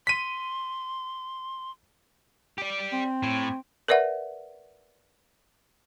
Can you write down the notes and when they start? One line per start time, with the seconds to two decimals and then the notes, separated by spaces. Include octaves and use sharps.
0.07 C6 B6 D#7
2.58 G4 D5
2.93 C4
3.23 A2
3.88 A#4 B4 D5 E5 F#5